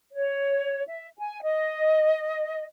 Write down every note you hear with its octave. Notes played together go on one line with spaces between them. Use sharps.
C#5
E5
G#5
D#5